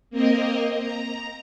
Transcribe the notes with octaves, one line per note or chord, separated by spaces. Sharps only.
A#3 C4 A#4 D#5
A#5